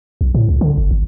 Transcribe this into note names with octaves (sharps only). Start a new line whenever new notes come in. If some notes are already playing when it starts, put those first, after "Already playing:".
B1
A2
C#2
D3
G1
G#1